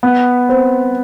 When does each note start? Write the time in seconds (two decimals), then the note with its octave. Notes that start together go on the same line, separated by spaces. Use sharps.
0.03 B3
0.49 C4